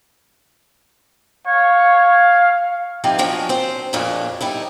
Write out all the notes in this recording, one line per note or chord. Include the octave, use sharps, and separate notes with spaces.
C#5 F5
F3 C4 D#4 E4 G4
F3 F#3 C#4 D4
C4 C5
F2 A#2 G#3 C#4 D4
G3 D#4 E4